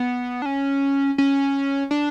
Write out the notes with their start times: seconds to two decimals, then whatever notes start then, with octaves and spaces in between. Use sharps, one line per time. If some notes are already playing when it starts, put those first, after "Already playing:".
Already playing: B3
0.42 D4
0.46 C#4
1.18 C#4
1.91 D4